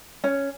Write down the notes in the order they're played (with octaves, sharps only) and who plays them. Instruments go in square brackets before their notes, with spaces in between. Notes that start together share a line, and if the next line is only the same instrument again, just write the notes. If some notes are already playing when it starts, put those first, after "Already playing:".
[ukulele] C#4